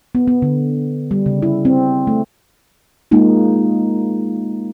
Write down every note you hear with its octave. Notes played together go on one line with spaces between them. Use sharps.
B3
B3
D3
G3
C#3
E4
C4
A3
G#3 A#3 D#4 F4